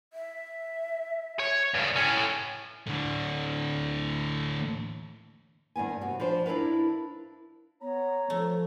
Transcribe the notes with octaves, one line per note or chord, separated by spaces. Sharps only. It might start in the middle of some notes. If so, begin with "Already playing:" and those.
E5
C#5
G2 C#3
A2 C#4 G#5
A2 D3
G2 D#3 B3 G#5
C3 F#4
F3 D4 B4 C5
D4 E4 A#4 B4 F5
B3 C#5 A#5
F3 A3